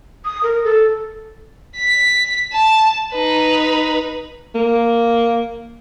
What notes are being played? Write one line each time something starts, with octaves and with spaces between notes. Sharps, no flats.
D#6
A#4
A4
B6
A5
D#4 B4
A#3